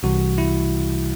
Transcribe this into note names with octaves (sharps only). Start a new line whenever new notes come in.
C2 C3 E3 G3 F#4
E4